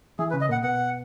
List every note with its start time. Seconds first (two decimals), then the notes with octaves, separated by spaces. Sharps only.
0.19 E3 G#4
0.31 B4
0.34 C#3
0.41 D#5
0.49 A#2 F#5
0.63 B2 F#5